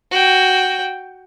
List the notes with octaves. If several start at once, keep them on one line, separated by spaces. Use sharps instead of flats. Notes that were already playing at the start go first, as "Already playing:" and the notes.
F#4 G5